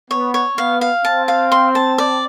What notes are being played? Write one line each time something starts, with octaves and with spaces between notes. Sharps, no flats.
B3 C#5
C#5
B3 F5
F5
C4 A5
F5
C6
A5
D5